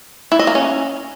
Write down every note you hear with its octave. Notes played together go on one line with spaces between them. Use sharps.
E4
D#5
A#3
C#4